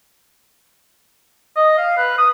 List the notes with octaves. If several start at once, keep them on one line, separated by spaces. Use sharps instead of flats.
D#5
F5
B4
D#6